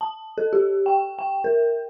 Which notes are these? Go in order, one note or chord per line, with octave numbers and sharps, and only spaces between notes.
A5
A4
G4
G5
G5
A#4